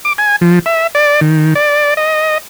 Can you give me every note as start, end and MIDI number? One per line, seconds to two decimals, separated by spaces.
0.05 0.13 86
0.18 0.36 80
0.41 0.59 53
0.66 0.87 76
0.95 1.20 74
1.21 1.54 51
1.55 1.94 74
1.97 2.38 75